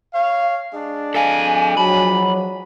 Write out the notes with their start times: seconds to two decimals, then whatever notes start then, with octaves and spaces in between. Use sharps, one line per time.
0.14 C#5 F5
0.73 G#3 D4
1.15 A4 F5 G#5
1.77 F3 F#3 B5